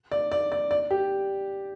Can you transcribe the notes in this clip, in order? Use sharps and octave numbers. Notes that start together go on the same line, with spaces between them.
D5
D5
D5
D5
G4